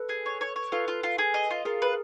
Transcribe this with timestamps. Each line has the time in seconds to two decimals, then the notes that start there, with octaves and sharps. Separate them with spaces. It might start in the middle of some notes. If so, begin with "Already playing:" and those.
Already playing: A4 B4
0.09 G#4
0.26 C#5
0.41 C#5
0.56 C#5
0.72 F4 A4 B4
0.88 F4
1.03 F4
1.18 G#4
1.34 D#5
1.50 F4
1.65 F4 G#4 A#4
1.82 B4